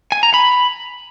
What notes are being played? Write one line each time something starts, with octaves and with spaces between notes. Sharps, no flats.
G#5
A#5
B5